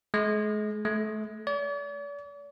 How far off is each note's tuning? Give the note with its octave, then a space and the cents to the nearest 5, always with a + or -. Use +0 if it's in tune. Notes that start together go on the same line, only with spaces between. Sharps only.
G#3 +35
A3 -30
D5 -45